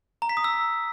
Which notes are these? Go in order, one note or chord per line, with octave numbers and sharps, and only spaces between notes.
A#5
B6
D#6
E6